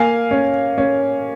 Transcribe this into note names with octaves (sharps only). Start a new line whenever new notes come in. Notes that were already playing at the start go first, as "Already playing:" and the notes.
Already playing: A#3 F5 G#5
C#4
C#4